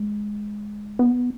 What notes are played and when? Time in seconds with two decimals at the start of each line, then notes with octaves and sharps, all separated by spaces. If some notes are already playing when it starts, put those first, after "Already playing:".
Already playing: G#3
0.99 B3